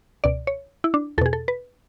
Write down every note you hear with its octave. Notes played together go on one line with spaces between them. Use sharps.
C#2 B2 D5
C#5
E4
D4
E2 B2 G#4 A4
A4
B4